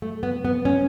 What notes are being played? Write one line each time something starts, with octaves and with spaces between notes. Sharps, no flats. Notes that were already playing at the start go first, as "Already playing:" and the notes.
A3
B3
B3
C#4